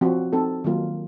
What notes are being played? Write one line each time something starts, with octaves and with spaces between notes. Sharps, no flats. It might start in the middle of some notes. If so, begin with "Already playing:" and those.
F3 C4 F#4
C4 D#4 A4
D#3 F#3 A#3 F4